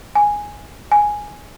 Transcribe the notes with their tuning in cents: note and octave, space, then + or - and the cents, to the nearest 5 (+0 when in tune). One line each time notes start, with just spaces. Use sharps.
G#5 -5
G#5 +0